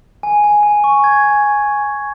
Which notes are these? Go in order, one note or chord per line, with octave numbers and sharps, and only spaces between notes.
G#5
G#5
G#5
C#6
G#5 G#6
G#5
G#5
C#6
G#5